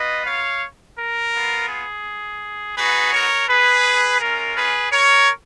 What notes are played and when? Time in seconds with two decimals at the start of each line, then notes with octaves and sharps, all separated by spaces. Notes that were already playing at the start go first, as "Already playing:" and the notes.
Already playing: B3 F4 B4 D#5
0.26 C#5 F5
0.98 A#4
1.34 B3 F4
1.69 G#4
2.77 B3 D#4 F#4 G#4 B4
3.12 A#4 C#5
3.48 G#4 B4
4.20 G#3 C#4 F4 A#4
4.56 G#4 B4
4.92 A#4 C#5